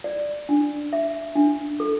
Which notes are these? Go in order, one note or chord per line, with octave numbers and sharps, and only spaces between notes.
D5
D4
E5
D4
A4